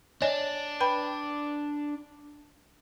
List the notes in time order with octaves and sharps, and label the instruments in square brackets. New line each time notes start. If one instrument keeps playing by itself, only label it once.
[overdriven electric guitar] D4 [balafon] C#5 D#5 G#5
[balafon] B4 G5 B5